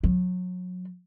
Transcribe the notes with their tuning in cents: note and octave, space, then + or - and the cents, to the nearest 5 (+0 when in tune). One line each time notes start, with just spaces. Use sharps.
F#3 -30